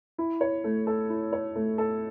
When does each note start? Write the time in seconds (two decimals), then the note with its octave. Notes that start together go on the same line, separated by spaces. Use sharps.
0.18 E4
0.41 C#5
0.64 A3
0.87 A4
1.10 E4
1.33 C#5
1.55 A3
1.78 A4